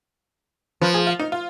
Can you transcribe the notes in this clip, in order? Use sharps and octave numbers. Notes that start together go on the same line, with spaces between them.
F3 B4
G#4
F4
D#4
F4